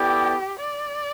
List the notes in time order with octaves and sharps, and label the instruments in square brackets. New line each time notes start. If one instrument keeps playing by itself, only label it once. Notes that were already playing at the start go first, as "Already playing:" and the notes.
Already playing: [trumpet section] B3 E4 A4 D5 G5 [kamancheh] G4
[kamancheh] D5